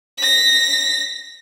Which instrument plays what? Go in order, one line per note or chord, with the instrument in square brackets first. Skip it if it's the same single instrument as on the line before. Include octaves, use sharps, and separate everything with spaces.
[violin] A#6 B6